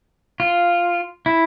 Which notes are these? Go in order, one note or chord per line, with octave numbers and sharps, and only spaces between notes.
F4
E4